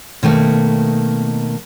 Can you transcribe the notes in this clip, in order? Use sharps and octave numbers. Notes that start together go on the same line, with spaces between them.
B2 D#3 A3 A#3